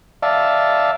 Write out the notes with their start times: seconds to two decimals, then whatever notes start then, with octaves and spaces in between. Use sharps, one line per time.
0.23 D5 E5 F5 A5